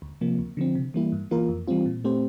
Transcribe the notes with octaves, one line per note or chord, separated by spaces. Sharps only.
D2
C3 F3 A#3
D2
D3 F3 C4
C3
E3 G3 A#3 E4
G2
E3 A#3 F4 A#4
F2
E3 G3 C4 F4
A#2
A3 C4 G4 C5